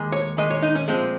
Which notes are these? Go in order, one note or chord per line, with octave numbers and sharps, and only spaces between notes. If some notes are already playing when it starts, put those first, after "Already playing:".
Already playing: D#2 D#3 G#3
C#5
D#2 D#3 G#3 D#5
C#5
D#4
C#4
A#2 F3 G#3 C4